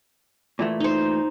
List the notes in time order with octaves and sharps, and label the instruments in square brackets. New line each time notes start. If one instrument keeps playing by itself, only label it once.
[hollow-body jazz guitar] A#2 E3 A3
[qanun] D#4 C5